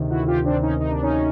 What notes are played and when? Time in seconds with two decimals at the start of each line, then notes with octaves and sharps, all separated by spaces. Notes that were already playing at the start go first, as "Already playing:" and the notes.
Already playing: D2 C3 D#3
0.10 E4 F#4
0.27 F4 G4
0.45 C4 D4
0.62 C#4 D#4
0.80 D#4
0.91 D4
1.02 C#4 D#4